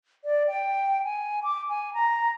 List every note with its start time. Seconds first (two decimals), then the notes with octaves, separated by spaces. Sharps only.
0.24 D5
0.48 G5
1.04 G#5
1.43 D6
1.69 G#5
1.94 A#5